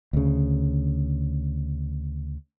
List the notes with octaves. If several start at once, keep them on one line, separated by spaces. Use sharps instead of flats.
D2 C#3